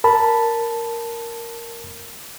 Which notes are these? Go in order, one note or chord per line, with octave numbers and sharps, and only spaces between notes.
A#4 A5 B5